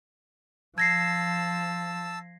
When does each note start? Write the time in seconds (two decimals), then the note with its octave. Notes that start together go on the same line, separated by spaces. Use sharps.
0.78 F3 A5 E6 G#6 A#6 C7